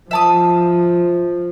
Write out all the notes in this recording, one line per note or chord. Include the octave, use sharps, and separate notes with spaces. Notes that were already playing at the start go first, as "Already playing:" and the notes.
F3 E5 A5 D#6